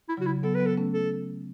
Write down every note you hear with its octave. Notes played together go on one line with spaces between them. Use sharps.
E4
C#3 F#3 F#4
E4
F#3 B3 A4
B4
F#3 B3
A4
A3 C#4
A4